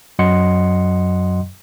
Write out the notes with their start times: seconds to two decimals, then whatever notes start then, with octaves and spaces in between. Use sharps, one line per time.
0.19 F#2 F#3 D#5 F#5 C6 C#7